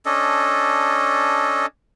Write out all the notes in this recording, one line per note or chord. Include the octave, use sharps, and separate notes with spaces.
C#4 D4 A4 D#5